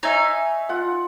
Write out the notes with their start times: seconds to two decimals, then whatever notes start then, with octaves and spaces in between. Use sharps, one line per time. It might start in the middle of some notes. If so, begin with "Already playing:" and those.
0.03 D#4 C#5 E5 G#5
0.69 F4 F#5